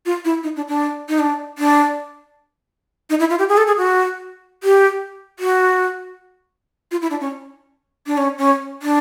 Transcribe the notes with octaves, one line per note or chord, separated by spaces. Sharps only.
F4
E4
D#4
D4
D4
D#4
D4
D4
D#4
E4
F4
G4
G#4
A4
G#4
F#4
G4
F#4
F4
E4
D4
C#4
D4
C#4
C#4
D4